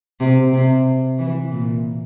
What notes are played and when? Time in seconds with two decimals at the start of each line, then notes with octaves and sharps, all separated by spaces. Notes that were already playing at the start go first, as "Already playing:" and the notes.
0.20 C3
0.53 C3
1.18 E3
1.51 A#2